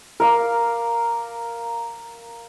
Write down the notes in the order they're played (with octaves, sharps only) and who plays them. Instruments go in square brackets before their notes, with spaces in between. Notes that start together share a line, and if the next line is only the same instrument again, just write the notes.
[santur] A#4 F5 D6